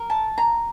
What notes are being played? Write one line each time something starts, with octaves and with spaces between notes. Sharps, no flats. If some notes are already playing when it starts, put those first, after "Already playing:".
Already playing: A#4
A5
A#5